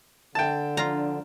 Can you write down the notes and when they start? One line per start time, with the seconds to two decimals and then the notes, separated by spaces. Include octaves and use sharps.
0.35 D3 G5 A5
0.77 F3 D4 F4 A#5